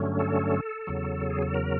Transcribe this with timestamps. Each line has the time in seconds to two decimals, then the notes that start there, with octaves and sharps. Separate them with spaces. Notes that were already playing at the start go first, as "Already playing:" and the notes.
Already playing: G2 D3 F#3 A3 C#4
0.19 A4
0.87 E2 C#3 F#3
1.30 G#4
1.42 A4
1.54 A#4